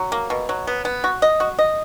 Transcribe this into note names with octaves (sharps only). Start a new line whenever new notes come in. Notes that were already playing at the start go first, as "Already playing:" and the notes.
Already playing: F#3
A#3
B2
F#3
B3
B3
F#4
D#5
F#4
D#5